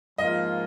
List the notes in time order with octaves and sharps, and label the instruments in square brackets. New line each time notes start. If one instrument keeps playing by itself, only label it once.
[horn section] G#2 F3 A#3 F4 [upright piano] D#5